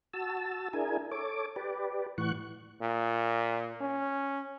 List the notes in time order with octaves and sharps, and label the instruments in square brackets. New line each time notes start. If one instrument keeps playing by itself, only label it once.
[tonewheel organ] F#4 A5 E6
D4 E4 G#4 A#4 G#5
A4 C#5 D6
G4 B4 D5
A2 E3 F#5 C#6 F#6
[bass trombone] A#2
C#4